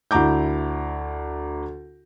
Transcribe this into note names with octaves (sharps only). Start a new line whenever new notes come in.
D2 E4 A#5 D6 G6